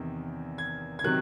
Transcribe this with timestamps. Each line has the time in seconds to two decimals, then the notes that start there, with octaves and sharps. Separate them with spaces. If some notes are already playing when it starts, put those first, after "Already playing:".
Already playing: E2 C3 D#3
0.58 G#6
0.99 G#6
1.04 C3 D#3 F#3 F#6